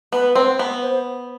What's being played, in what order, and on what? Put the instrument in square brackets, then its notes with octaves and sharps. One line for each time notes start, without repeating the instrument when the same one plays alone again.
[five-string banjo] B3 [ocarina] B4
[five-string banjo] C4 [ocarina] C5
[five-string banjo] B3
[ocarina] C5